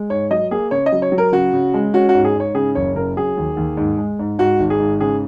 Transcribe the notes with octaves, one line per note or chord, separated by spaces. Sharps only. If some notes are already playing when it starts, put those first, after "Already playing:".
Already playing: G#3
G#2 C#5
F#3 D#5
A#3 G#4
C#3 C#5
D#5
F#3
C#5
F#3
A#4
C#3 F#4
C#3
G#3
C#4 F#4
G#2 F#4
G#4
G#2 C#5
C#3 G#4
F#1 C#5
C#3 A#4
F#3 G#4
D#2
D#2
G#2
G#3
G#2
G#2 F#4
G#1
G#4
G#2
C#3 G#4